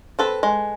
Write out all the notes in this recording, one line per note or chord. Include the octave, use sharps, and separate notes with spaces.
C4 A4 B4
G#3